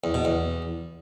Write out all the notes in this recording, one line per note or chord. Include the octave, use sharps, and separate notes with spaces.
E2
B2
E2